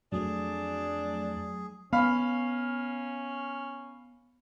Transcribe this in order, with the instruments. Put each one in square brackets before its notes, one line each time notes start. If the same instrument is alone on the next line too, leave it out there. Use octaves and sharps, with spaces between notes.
[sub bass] F2 [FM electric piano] F#3 A3 [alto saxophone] D4 [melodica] G#4
[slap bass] B3 [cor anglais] C#4 [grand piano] F5 B5